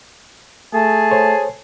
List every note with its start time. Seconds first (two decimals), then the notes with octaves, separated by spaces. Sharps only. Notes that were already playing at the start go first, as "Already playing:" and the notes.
0.74 A3 G#4 A5
1.11 A4 C5 C#5